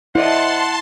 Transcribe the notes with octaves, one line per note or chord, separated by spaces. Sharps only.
E4 C5 D5 D#5 F#5 A5 C6